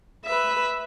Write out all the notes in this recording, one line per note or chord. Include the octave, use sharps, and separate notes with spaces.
B4 E5